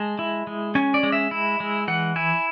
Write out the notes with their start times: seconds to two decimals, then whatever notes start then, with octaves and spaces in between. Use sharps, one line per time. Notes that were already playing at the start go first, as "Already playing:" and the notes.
Already playing: G#3 A5
0.19 E4
0.47 G#3
0.75 C#4 G#5
0.94 D5
1.03 G#3
1.12 E5
1.31 E4
1.60 G#3
1.88 E3 F#5
2.16 E4 G#5